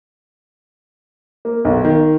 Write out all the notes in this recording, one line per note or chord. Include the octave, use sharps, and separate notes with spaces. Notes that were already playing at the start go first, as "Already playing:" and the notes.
A#3
B1
D#3